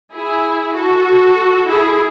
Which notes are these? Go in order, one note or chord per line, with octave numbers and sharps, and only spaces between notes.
E4 G#4
F#4 A4
E4 G#4